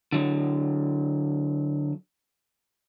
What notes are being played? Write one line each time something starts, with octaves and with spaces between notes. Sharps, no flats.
D3 F#3